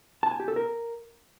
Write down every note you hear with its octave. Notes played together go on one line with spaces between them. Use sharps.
A5
G#5
G4
A4
A#4